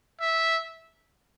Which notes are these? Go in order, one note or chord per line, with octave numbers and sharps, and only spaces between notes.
E5